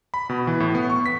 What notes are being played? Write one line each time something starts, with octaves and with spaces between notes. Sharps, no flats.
B5
B2
E3
A2
B3
C#6
B6